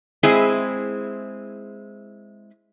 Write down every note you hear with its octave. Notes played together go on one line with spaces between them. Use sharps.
G#3 C4 E4 G#4